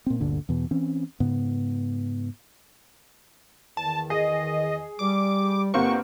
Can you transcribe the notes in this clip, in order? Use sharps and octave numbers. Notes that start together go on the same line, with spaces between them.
A#2 C4
G1 D2 A#2 D3
E2 B2
E3 C4 C#4
G#2 C#3 B3
E2 D#3 A5
G#4 D#5
G3 D6
G1 A#3 C4 G4 B4 F#5 C#6